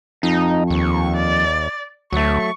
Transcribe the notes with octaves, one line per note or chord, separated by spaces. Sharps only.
F2 D#4
D#2 C#6
D5
D2 F#3 A3 C#6